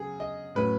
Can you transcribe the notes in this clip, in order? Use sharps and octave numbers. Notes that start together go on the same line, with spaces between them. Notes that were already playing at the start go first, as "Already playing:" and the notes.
Already playing: C#3 F#3 G#4
D#5
A2 F#3 C#4 B4